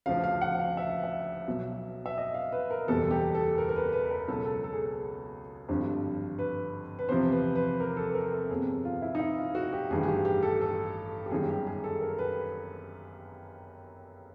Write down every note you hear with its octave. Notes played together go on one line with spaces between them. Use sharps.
D2 C#3 F3 F5
F5
F#5
F5
E5
F5
E5
B1 B2 F#3
E5
D#5
F5
B4
A#4
F#1 E2 B2 G3 A4
G4
A4
A#4
A#4
B4
B4
A#4
C#2 B2 F#3 A4
A4
A4
G#4
A4
G#1 G2 D3 F3
B4
B4
E2 C3 F3 C5
B4
B4
A#4
A4
B4
A#4
A4
G1 F2 C3 G#4
F4
E4
D#4
E4
F4
F#4
G4
A1 G2 D#3 G#4
G#4
G4
G4
A4
A4
G4
G1 F#2 D#3 G3 G#4
G4
G#4
A4
A#4
B4